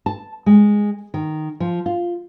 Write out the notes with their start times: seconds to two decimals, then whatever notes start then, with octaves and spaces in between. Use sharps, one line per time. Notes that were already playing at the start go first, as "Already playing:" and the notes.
0.06 A5
0.46 G#3
1.14 D#3
1.60 F3
1.86 F4